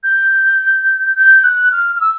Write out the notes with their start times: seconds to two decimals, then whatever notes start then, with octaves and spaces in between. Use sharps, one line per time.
0.03 G6
1.16 G6
1.44 F#6
1.72 F6
1.95 F6
2.01 E6